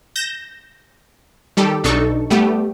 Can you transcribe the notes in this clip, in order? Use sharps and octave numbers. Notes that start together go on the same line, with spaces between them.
G6 A#6 E7
D#3 G3 G4 A4
B1 D4 D#4 A4 C#6
G3 A3 B3 G4